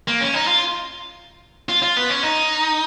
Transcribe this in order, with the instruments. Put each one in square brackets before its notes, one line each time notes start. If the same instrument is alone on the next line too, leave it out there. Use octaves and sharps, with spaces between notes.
[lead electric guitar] A#3
C#4
D#4
F4
F4
F4
B3
C#4
D#4